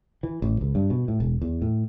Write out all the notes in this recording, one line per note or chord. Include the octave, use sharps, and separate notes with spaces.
E3
A1
C#2
G2
B2
A2
E1
E2
A2